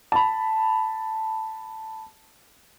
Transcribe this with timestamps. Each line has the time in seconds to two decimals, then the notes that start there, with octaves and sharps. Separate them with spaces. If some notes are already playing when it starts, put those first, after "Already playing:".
0.12 A5 B5